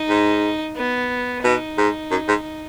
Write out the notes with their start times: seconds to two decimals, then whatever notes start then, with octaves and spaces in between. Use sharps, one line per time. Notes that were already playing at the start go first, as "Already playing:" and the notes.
Already playing: D#4
0.09 G#2
0.77 B3
1.44 B2 D#4
1.78 G#2
2.11 F#2
2.28 G#2